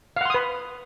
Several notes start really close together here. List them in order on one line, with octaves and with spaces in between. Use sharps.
F5 F#5 C6 D#6 B4